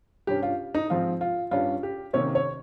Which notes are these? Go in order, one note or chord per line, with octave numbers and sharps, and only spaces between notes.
G2 G3 C#4 G4
F4
D#4
G#2 F3 C4 F4
F4
G2 G3 C#4 F4
G4
C3 D#3 A#3 C#4 C#5
C#5